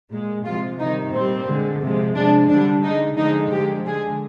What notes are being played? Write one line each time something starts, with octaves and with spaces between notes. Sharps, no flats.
A#2 G#3
C3 F3 G#3 F4
C3 D#3 G3 D#4
A#2 G3 C4
D3 G#3
C3 F3 G#3
C3 F3 G#3 D4
D3 G3 D4
D3 G#3 D#4
D3 F3 G#3 D#4
D3 F3 G#3 G4
D3 G#3 G#4